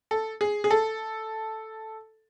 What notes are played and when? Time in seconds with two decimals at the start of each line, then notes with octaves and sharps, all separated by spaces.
0.11 A4
0.41 G#4
0.64 G#4
0.71 A4